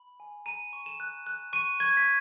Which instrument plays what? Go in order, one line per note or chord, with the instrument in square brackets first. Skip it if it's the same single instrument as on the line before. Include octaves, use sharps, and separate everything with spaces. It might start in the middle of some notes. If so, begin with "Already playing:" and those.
Already playing: [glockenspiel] B5
G#5
A#5 D#7
C#6
E7
F#6
F#6
C#6 D#7
C#6 G#6
B6